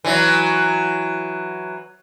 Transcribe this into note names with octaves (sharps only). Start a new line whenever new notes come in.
E3 F#3